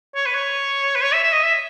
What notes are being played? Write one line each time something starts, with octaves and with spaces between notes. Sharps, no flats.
C#5
B4
C#5
B4
C#5
E5
E5
D#5
E5